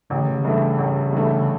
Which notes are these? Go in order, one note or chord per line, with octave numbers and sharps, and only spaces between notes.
A1 C#3
D3
C#3
G2 E3 A3
A1
G2 E3 A3
C#3